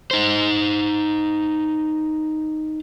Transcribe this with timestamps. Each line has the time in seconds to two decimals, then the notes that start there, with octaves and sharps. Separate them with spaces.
0.11 D#4 C5